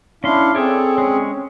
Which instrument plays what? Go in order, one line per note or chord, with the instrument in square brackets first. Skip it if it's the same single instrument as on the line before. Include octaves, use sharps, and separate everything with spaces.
[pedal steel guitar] C#4 C6 [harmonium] D4 E4 F5
[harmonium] C4 G#4 [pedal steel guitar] A4 C#5 D5
[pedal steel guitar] G#3 C#4